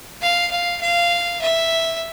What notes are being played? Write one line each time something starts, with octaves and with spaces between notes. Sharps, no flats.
F5
F5
F5
E5